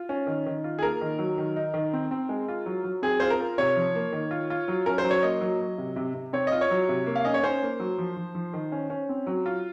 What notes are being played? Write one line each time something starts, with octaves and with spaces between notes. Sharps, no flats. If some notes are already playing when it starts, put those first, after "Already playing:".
Already playing: F4
C#4
D#3
D#3
F4
G#4
A#3 A#4
D#3
F#3
D#3
D#4
D#3
C4
C4
G#3
F4
F#3
F#3
C4 G#4
F4 C5
A#4
F4
C3 C#5
F3
A#3
D#3
F4
F4
F#3
C#4 A#4
C5
F#3
C#5
A#3 D#5
F#3
F#3
C3
C3
C3
C4 C#5
F4 D#5
C#5
F#3
C3
A#3
F5
C#4 D#5
C#5
C#4 C5
A#3
F#3
F3
F3
F3
D#3
C#4
C#4
C4
F#3
F4